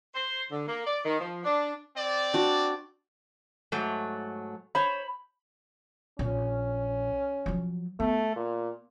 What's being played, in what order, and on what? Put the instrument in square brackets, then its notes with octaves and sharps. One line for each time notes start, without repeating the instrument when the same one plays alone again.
[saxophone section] C5
D3
A#3
D5
D#3
F3
D4
[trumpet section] C4 D5
[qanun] D4 F#4
[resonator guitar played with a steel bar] G#2 F#3 A3
[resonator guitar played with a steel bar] C5 C#5 [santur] B5
[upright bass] A#1 [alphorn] C#4
[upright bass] F3 F#3
[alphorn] A3 [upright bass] B3
[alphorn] A#2